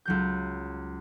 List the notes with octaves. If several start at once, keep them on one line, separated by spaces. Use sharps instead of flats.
C#2 F#3 G6